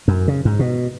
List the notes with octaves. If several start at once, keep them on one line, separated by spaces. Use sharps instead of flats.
F#2
C#3
G#2
B2